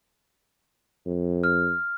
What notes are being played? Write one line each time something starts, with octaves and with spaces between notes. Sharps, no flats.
F2
F6